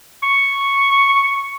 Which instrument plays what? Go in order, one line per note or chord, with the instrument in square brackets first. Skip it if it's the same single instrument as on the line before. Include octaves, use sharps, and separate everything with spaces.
[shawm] C#6